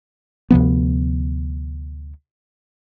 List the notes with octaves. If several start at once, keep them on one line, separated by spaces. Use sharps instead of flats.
D2 C3 F3 B3